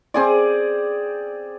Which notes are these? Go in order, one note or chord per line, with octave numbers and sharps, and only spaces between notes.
C4 G#4 D5